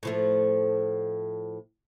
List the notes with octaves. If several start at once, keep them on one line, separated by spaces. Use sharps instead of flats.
A2 F3 A3